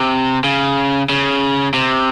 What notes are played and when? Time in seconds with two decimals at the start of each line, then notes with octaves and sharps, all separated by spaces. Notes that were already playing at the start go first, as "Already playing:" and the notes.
Already playing: C3
0.44 C#3
1.09 C#3
1.74 C3